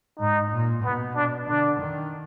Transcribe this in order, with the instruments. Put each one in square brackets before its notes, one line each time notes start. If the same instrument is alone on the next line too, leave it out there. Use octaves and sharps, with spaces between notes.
[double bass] G#2 [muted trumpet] D#4
[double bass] A#2
[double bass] B2 [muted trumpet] B3
[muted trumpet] D4
[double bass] D3 [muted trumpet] D4
[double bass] D#3